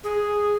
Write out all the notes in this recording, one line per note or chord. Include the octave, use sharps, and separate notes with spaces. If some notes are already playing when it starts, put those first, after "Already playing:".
G#4